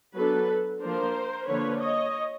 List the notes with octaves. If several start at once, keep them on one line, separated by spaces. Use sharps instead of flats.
F#3 B3 D4 A4 B4
F3 A#3 D4 A#4 C5
D3 F3 A#3 D4 B4 C#5
C#5 D#5